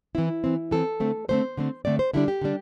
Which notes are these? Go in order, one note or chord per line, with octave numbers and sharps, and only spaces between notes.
E3 C4 E4
E3 C4
E3 C4 A4
D3 A3 C4
D3 A3 C4 C5
D3 A3 C4
D3 A3 C4 D5
C5
D3 G3 D4 E4
G4
D3 G3 D4